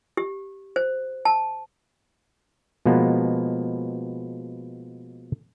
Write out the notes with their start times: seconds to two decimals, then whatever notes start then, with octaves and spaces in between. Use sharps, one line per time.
0.17 G4
0.76 C5
1.25 A5
2.86 B2 F3 G#3 A#3 B3